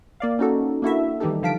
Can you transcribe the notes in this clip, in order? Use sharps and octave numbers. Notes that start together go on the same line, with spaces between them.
A#3 D5 F5
C#4 D#4 F#4 A4
A#3 D4 E4 F#4 A4 E5
D#3 E3 G3 D#4 G4 A4
D3 F3 F5 A5 B6 D7